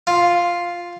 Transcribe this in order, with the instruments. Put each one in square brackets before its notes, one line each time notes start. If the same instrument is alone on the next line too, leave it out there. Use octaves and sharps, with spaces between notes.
[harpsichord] F4